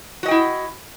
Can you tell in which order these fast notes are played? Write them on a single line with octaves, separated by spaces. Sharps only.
F#4 D#5 G5 E4